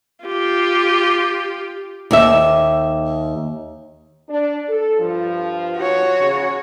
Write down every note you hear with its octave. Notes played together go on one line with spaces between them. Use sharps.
F4 G4
D#2 E5
D4
A4
G2 F3
F#4 C#5
C#3